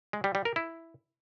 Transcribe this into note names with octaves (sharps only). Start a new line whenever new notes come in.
G#3
G3
G3
A#4
E4